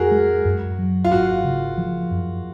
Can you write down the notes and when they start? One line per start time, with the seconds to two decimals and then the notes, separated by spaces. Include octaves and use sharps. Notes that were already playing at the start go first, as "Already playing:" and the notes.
Already playing: F2 F#4 G#4 A#4
0.11 G#3
0.45 F#2
0.79 F#3
1.04 F4
1.12 G#1 F#4
1.44 C#3
1.78 F3
2.11 F#2